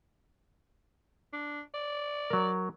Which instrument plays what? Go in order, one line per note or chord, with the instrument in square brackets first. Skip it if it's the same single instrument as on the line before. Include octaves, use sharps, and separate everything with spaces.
[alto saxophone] D4
D5
[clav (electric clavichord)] F#3 A#4